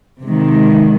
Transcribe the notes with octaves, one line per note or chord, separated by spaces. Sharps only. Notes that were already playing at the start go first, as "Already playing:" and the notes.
C3 D#3 G#3